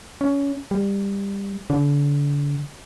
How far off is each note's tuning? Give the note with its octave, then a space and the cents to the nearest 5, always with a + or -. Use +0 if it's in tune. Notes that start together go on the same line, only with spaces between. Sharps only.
C#4 +20
G3 +20
D3 -35